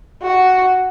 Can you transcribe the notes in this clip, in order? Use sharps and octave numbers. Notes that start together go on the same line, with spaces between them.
F#4